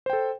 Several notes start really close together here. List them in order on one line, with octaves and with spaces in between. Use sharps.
C5 G5 A4